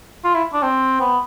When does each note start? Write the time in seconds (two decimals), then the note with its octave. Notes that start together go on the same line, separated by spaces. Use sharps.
0.24 F4
0.35 E4
0.53 D4
0.63 C4
1.01 B3